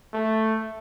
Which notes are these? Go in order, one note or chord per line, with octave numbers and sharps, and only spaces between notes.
A3